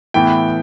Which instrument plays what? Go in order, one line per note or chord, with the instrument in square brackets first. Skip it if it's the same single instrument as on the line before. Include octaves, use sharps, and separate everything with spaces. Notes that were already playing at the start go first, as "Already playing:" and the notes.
[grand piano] A2 E3 B3 G5